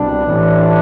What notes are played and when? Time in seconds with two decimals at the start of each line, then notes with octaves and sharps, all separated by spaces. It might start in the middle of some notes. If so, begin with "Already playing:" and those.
Already playing: C2 B2 G3 D4
0.25 A1 A2 E3